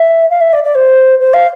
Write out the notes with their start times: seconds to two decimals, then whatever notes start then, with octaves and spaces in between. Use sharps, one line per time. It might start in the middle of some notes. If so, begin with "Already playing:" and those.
Already playing: E5
0.30 F5
0.40 E5
0.52 D5
0.63 D5
0.75 C5
1.19 C5
1.33 F5